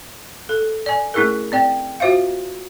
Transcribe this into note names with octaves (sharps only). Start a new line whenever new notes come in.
A4
D5 G#5
A3 C#4 E4 G#4 A#4
C4 D5 G5
F4 F#4 C5 E5 F5